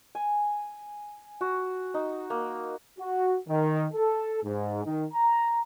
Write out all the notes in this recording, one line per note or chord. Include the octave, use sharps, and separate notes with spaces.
G#5
F#4
D#4
A#3
F#4
D#3
A4
G#2
D#3
A#5